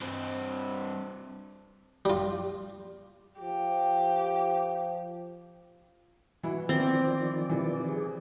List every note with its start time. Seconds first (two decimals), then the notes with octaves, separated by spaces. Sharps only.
0.01 G2 C4
2.05 G3 F4
3.40 F3 G4
6.43 E3 E4 F#4
6.69 D#3 F3 C4 D5
7.50 C3 E3
7.89 G#4